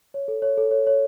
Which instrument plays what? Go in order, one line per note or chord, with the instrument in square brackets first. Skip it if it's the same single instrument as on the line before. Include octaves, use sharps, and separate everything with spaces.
[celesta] C#5
A4
C#5
A4
C#5
C#5